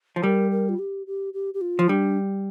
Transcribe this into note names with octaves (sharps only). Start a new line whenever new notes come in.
F3
G3 A#4
A#4
F4
G4
G4
G4
G4
F4
F3
G3 D4